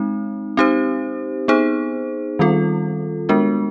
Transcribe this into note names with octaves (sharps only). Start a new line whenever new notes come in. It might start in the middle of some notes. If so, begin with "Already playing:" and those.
Already playing: G#3 C4 D#4
C4 D#4 G4 C5
B3 D#4 G#4 C5
D#3 G3 C4 F4 A4
G#3 B3 D4 F#4 A#4